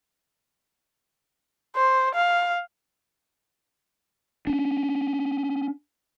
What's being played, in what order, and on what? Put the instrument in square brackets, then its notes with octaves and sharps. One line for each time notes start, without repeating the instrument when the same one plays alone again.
[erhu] C5
F5
[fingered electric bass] C#4 D4